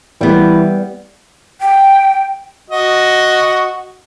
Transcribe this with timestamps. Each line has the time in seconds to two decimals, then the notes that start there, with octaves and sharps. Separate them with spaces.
0.21 E3 G3 B3
1.60 G5
2.70 F#4 D#5